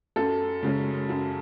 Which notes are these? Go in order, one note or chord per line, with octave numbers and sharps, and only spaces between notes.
F#2 A4
C#3 G#3 C#4
F#2